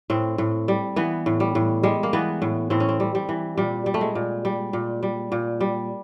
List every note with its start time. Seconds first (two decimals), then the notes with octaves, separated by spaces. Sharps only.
0.10 A2 C4
0.38 A2
0.68 G3
0.96 E3 B3
1.26 A2
1.40 G3
1.55 A2
1.83 G3 G#3
2.03 A#3
2.13 E3 B3
2.42 A2
2.70 A2 C4
2.80 C#4
2.89 C4
3.00 G3
3.15 G3
3.29 E3
3.57 A#2 G3
3.86 G3
3.94 A3
4.01 G#3
4.15 A#2
4.45 G3
4.73 A#2
5.03 G3
5.32 A#2
5.61 G3